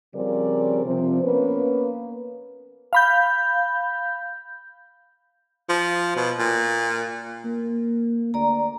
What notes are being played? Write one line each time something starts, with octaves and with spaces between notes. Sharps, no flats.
C#3 F3 G3 C4 A#4 D5
C3 F3 C4
A#3 B3 C#4 B4
F5 B5 G6
F3
B2
A#2
A#3
D2 D5 A#5